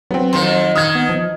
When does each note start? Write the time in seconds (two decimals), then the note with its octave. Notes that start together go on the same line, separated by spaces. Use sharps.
0.11 F#3 B3 C4
0.33 F2 D#3 C6
0.75 D#3 D#6 F6 G#6
0.95 B3
1.09 F3